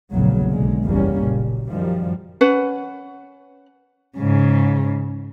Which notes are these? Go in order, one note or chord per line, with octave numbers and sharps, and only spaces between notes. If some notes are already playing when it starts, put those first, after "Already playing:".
F1 A#1 E2 A#2 C#3 F#3
B1 D3 G#3
F#1 E2 G3 A#3 C#4
F#1 A#2
F#2 D#3 F3 G3
C#4 B4 F#5
G#2 C#3